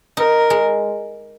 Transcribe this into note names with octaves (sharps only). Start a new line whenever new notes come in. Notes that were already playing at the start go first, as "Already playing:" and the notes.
D#4 A#4
G#3